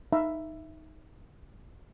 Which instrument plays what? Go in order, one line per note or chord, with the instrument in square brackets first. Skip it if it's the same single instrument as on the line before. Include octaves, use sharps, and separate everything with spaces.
[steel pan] D#4 E5 F5 A#5 B5